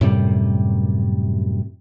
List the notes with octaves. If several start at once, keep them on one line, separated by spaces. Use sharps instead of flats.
F#2 A2 C3 G3